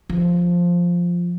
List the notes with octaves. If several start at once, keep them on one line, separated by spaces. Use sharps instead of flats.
F3